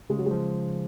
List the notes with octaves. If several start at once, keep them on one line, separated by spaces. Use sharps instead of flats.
C#3 G#3
F#3
F3 G#3